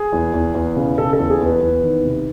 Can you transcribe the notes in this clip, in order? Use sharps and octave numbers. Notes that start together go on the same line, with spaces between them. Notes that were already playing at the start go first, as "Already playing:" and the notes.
Already playing: G#4
E2
E2
E2
C#3
C#3 A4
A4
E2
G#4
E2
B4
E2
D#3
C3